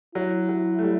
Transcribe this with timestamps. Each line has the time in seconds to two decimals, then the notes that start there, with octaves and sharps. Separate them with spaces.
0.15 F#3 E4
0.49 F#3
0.79 A3
0.83 G3